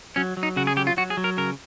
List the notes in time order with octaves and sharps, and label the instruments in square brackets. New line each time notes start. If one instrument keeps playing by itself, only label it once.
[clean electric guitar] F#3 C#4
F#3
D#4
C#3 F#4
G#4
F#3 G4
F4
F#3 F#4
G#4
F#3
A#4
C#3 A#4